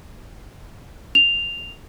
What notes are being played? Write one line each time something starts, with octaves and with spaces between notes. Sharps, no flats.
F7